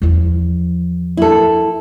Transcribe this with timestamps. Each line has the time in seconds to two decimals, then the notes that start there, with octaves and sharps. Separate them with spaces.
0.02 E2 F3
1.17 E4 A4